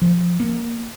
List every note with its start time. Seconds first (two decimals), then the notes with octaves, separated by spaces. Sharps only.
0.02 F3
0.40 A#3